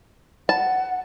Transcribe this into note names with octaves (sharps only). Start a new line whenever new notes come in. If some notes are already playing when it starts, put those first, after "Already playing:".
F#5 A5